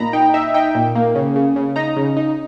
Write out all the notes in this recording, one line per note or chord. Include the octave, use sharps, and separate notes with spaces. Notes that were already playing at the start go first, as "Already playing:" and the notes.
Already playing: A#2 D#4 A#5 B5
D#4 G5
D#4 E5
D#4 G5
A#2
A#3
C#3
C#3
C#3
D#4 A#5
C#3
D#4